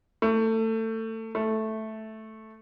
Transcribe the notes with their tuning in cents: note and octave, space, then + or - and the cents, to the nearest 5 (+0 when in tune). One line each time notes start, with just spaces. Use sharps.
A3 +25
A3 -5